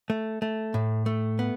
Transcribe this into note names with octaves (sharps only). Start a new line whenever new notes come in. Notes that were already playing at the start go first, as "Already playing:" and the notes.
A3
A3
A2
A3
B3